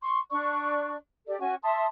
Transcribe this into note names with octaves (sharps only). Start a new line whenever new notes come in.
C6 C#6
D4 D5 C#6
G4 A4 D5
C#4 F#4 G#5 C#6
E5 A5 C6 D#6